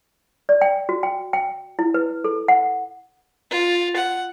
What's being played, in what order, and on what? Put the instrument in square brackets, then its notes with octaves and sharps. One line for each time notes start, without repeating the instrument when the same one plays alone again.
[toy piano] D5
G5
F#4
G5
G5
E4
B4
A4
F#5
[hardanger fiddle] F4
F#5